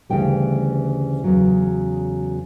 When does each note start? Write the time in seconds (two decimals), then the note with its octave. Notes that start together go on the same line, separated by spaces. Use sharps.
0.10 D2 C#3 E3 G3 G5
1.24 E2 C#3 F#3